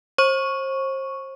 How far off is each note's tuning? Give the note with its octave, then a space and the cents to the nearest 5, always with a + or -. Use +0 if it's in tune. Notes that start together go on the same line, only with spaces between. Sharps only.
C5 +35 C#6 +0